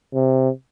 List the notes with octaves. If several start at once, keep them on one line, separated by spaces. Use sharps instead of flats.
C3